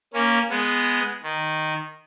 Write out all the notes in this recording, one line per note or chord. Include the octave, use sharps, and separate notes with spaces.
A#3 C#4
G#3 B3
D#3